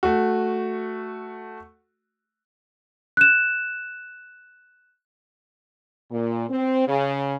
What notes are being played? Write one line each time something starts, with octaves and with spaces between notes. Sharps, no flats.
A3 F#4
F#6 E7
A#2
C4
C#3